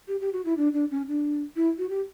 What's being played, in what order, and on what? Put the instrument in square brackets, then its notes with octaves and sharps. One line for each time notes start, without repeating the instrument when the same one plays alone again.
[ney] G4
G4
F#4
E4
D4
D4
C#4
D4
E4
F#4
G4